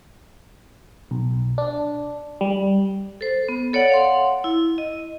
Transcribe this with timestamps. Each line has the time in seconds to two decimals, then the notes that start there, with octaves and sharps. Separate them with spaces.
1.11 B1
1.58 D4
2.41 G3
3.21 A4 C5
3.48 B3
3.73 A4 C#5 D5 F#5
3.90 F5 F#5 C6
4.44 E4
4.78 D#5